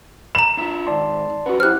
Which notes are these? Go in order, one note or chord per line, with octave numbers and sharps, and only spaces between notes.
A#5 B5 E7
D4 F4 E5
G#2 D#3 D5 A5 C6
F2 C#4 F#4 B4 F#5
E4 G4 C5 F6 F#6